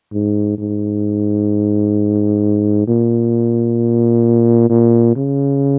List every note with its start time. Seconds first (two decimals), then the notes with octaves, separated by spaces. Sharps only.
0.13 G#2
0.58 G#2
2.87 A#2
4.70 A#2
5.16 C#3